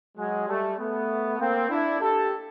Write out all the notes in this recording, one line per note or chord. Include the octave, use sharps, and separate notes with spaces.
F#3 G#3
G3 A3
A3 B3
A#3 C4
D4 E4
G4 A4